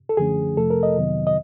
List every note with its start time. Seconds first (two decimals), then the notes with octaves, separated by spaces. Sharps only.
0.09 A4
0.17 F#2 D3 F3 A3 C#4 G#4
0.57 F2 C3 F3 A3 A4
0.70 A#4
0.83 D#5
0.97 F2 C3 D#3 F#3 B3
1.27 D#5